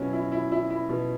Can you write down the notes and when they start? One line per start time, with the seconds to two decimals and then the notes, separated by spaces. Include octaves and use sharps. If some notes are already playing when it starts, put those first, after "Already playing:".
Already playing: B2 F#3 C#4 E4
0.13 E4
0.32 E4
0.52 E4
0.70 E4
0.89 B2